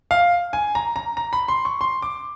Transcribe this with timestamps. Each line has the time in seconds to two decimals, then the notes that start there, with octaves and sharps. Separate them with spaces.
0.11 F5
0.53 G#5
0.75 A#5
0.96 A#5
1.17 A#5
1.33 B5
1.48 C6
1.65 C#6
1.81 C6
2.02 D6